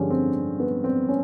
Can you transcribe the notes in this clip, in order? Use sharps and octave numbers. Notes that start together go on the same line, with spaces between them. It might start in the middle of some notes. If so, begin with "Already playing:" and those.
Already playing: G2 D3 F3 G#3 C#4 G4
C4
B3
C4
C#4